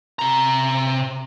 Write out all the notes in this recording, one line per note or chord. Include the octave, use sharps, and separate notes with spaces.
C3 A#5